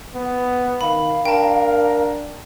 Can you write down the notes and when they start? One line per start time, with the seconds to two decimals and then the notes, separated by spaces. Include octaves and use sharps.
0.15 B3
0.81 D#3 F5 B5
1.25 D4 A#4 G5 A5